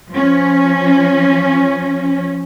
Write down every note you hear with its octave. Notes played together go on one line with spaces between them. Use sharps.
F3 C#4